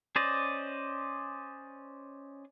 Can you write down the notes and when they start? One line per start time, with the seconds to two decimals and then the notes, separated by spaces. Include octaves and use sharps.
0.16 C#4 C5 D5 D#5